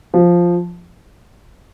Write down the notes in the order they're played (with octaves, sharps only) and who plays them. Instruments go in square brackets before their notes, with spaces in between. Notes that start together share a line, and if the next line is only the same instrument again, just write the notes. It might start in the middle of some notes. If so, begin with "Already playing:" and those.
[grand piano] F3